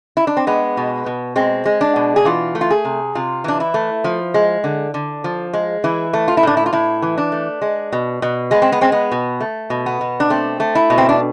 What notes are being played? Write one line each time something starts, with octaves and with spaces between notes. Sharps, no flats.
E4
D4
C4
G#3 B3
B2
B2
G#3 C4
G#3
D4
B2
G#4
E3 F4
A3
F4
G#4
C3
C3 F4
E3 D4
E4
A3
F3
G#3
D3
D3
F3
G#3
E3 E4
A3
F4
E4
A2 D4
E4
F4
A2 E4
E3
D4
A3
G#3
B2
B2
G#3 B3
C4
B3
G#3 C4
B3
B2
A3
B2
B3
B2
D4
A3 C4
A3
E4
B2
C4
D4